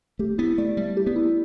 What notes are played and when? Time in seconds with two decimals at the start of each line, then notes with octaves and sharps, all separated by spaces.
0.19 A3 G4
0.38 B3 E4
0.58 A3 D5
0.77 G3 A3
0.97 G4
1.07 B3
1.16 E4